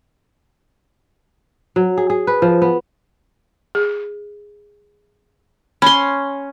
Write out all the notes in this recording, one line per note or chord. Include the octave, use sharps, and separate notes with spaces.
F#3
G#4
G#4
B4
F3
B3
G#4
C#4 B5 C6